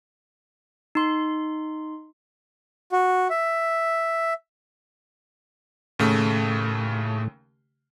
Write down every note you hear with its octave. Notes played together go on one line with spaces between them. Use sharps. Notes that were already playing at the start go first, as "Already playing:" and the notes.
D#4 C6
F#4
E5
D#2 A2 C#3 A3